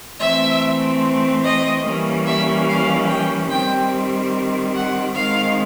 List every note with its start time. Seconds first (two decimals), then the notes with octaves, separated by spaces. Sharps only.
0.19 E3 A3 C4 E5
1.44 D#5
1.84 E3 G3 A#3 C#4
2.26 E5
2.67 F5
3.08 G5
3.50 D#3 G3 C4 G5
4.74 F#5
5.15 D#3 G#3 C4 F5